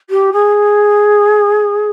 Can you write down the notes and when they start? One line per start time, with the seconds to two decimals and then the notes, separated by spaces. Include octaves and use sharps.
0.10 G4
0.32 G#4